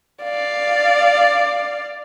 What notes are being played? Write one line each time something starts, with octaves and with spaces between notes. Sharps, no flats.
D5 F5